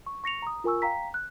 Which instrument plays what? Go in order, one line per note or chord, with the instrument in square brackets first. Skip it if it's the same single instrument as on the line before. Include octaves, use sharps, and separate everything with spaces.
[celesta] C#6
C#6 A#6 C#7 F7
A#5 D#6
F4 A#4 G#5 C#6 E6
F5 G5 A#5 B6
F#6